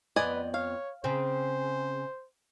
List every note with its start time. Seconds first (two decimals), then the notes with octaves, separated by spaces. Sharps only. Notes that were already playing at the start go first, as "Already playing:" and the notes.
0.16 F2 B3 B4 D5 D#5 G#5
0.54 C#5 F5
1.04 C#3 C4 C5